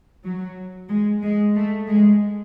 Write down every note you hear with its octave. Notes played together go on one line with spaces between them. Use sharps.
F#3
G#3
G#3
A3
G#3